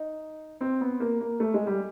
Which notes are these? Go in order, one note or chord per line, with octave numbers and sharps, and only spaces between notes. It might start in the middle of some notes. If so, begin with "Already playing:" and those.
Already playing: D#4
C4
B3
A#3
A#3
A3
G#3
G3